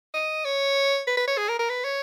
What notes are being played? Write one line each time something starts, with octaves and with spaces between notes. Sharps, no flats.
D#5
C#5
B4
B4
C#5
G#4
A#4
A#4
B4
C#5